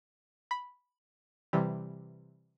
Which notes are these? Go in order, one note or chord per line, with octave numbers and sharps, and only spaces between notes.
B5
C3 E3 G3